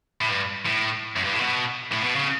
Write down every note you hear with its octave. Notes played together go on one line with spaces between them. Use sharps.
A2
G2
A2
F#2
G2
A2
B2
A2
B2
C#3